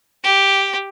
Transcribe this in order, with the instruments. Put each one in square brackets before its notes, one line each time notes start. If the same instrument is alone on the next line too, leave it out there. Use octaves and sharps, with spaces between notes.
[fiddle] G4